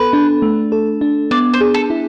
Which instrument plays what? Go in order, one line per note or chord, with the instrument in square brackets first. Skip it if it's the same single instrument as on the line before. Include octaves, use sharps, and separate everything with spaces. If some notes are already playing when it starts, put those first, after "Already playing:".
Already playing: [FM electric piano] B3 A4 [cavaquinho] B4
[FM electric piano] D4
A3
A4
D4
[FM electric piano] B3 [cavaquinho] D5
[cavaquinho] C5
[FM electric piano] G#4
[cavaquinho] A4
[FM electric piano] E4